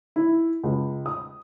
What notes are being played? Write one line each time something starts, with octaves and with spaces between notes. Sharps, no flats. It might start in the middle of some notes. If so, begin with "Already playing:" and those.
E4
C#2
D#6